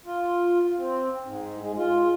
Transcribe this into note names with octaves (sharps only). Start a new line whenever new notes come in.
F4
C4
G#2
G#3
F4